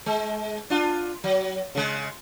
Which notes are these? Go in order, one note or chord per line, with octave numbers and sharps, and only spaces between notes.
G#3
D4 F4
F#3
C#3 G#3